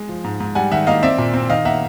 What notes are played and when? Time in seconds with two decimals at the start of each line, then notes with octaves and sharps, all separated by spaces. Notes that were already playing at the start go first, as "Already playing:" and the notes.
Already playing: G#3
0.09 F3
0.24 G#2
0.40 G#2
0.55 G3 F#5 G#5
0.71 D#3 E5 F#5
0.87 A#3 D#5 F5
1.03 C4 D5 E5
1.18 A#2
1.34 C4
1.50 D#3 D#5 F5
1.65 A#3 E5 F#5